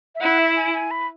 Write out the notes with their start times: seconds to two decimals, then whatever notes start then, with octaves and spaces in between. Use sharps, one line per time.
0.15 E5
0.21 E4 F#5
0.39 E5
0.56 G#5
0.74 G#5
0.91 B5